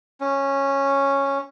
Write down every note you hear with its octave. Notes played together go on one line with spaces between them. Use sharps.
C#4